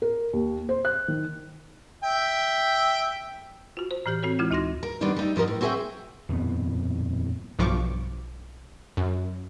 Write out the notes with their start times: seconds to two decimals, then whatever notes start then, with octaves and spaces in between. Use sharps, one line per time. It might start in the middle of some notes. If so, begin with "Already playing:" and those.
0.02 A#4
0.33 D#2
0.69 C5
0.85 F#6
1.08 D#3
2.04 E5 G5
3.77 F4 F#4
3.91 C5
4.06 A2 E3 G4 G6
4.23 C4 F#4 A4 C#5
4.39 E3 G#3 E4 F4
4.51 D2 D#4 F#4 C6 A#6
4.83 A#4
5.01 D#3 G3 B3 C4 D4 D#4
5.16 G3 D#4 E5
5.36 F#2 F3 F4 A#4 D#5
5.48 A2
5.61 C4 F#4 G#4 B4 E5 G5
6.29 D#1 F2 A2 B3
7.59 B1 G2 F3 C#6 D6
8.97 F#2